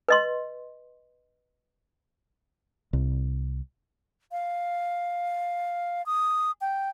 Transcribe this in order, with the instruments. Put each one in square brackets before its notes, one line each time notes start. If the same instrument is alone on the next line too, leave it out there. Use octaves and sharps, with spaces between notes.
[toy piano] B4 D#5 C6
[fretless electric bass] C2
[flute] F5
D#6
G5